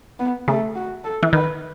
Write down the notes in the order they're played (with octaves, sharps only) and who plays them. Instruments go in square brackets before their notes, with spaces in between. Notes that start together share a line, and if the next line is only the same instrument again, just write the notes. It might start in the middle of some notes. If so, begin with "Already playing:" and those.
[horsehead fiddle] B3
[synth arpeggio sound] C#3 [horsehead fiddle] A3
[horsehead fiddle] F#4
A4
[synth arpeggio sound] E3
[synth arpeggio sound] D#3 [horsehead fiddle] B4